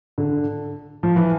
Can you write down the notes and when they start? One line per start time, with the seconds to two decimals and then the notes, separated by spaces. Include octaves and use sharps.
0.18 D3
1.03 F3
1.16 E3